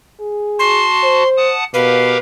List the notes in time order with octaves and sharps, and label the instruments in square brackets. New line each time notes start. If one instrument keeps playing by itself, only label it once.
[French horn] G#4
[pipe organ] F#4 A5 [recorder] C6
[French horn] C5
[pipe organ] F#5 A5 D#6
[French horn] B2 [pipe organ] G4 A#4 F5 [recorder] B4